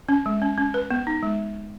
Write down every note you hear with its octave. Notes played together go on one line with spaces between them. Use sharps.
C#4
G#3
C#4
C#4
B4
B3
D#4
G#3